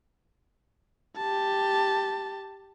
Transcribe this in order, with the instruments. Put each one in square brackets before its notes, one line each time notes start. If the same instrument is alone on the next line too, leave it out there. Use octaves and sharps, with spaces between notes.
[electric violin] G4 A5